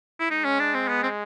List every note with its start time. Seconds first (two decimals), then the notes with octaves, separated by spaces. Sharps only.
0.20 E4
0.30 G#3 D#4
0.45 C#4
0.60 D4
0.74 C4
0.88 B3
1.03 C4